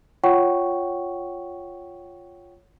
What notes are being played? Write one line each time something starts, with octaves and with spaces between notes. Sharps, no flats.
F4 C#5 F#5 G5 C#6